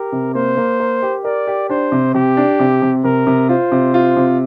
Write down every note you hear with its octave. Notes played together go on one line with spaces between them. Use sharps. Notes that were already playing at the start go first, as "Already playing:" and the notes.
Already playing: G4 A#4
C3
A#3 C5
A#3
A#4
G4
A#4 D5
G4
D4 C5
C3
C3 G4
D4
C3
C3
C3 A#4
C3
F4 C5
C3
F4
C3